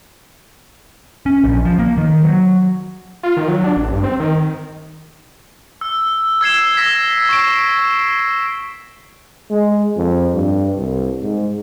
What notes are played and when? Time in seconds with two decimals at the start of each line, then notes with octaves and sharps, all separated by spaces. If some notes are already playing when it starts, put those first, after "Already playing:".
1.26 C#4
1.44 A#1
1.65 F3
1.79 A#3
1.98 D#3
2.23 F#3
3.23 F4
3.37 D#3
3.48 F#3
3.64 D4
3.77 A1
3.92 G2
4.04 C4
4.20 D#3
5.81 E6
6.41 E6 G#6 C7 E7
6.77 E6 A#6 B6
7.29 C#6 C7 D7
9.51 G#3
9.97 F2
10.34 G2
10.77 C2
11.22 G#2